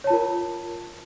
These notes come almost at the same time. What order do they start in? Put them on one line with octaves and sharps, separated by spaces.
C#5 A5 F4 A#4